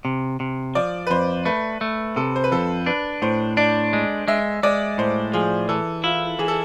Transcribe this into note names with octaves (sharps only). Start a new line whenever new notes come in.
C3
C3
F3 D5
B4
F2 C5
A3 B4
A3
C3 A4
C5
B4
F2 A4
D4 B4
A2 C5
D4 D5
G#3
G#3 E5
G#3 D5
A2 C5
F3 G#4
E3 A4
E4 F4
E3 G#4
A4